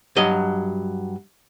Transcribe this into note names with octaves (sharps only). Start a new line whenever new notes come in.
G2 F#3 D#5